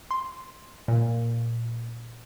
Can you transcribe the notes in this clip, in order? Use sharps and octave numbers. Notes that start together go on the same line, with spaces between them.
C6
A#2